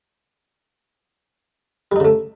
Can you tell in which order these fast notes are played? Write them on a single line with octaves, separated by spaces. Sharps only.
G3 D#4 C#3 A3